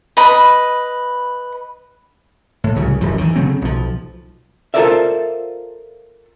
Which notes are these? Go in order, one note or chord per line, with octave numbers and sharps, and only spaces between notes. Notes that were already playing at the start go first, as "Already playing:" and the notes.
B4 D#5 B5
A2
C2 C#3 F#3
D1 F#2 F3
D#3 E3
C#3 F#3 A3 C4
B1 F3
F4 A4 A#4 C5 D5 E5